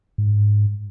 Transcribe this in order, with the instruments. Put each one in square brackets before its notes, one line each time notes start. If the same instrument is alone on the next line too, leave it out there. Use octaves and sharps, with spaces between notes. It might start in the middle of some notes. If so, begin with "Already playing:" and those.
[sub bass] G#2